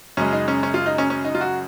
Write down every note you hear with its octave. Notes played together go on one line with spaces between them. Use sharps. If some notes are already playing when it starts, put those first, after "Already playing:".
F#2 C#3 G#3 C#4
D#4
C#4
C#4
F4
D#4
C#4
C#4
D#4
F4
F#4